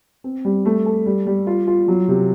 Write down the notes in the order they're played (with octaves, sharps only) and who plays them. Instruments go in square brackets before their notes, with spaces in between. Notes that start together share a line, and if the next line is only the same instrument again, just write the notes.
[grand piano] C4
G3
A3
A4
G3
G3
F4
F4
F#3
C3